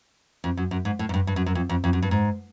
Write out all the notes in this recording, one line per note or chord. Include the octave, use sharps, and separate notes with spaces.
F2
F#2
F#2
G#2
A2
G#2
G2
G2
F#2
F#2
F2
F2
F2
F#2
G2
G#2